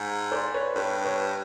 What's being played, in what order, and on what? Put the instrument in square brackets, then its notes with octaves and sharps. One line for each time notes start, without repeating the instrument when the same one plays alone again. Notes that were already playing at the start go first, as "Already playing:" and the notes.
Already playing: [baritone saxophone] G#2
[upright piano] C5 D5
B4 C#5
[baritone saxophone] G2 [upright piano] B4 C#5
[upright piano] B4 C#5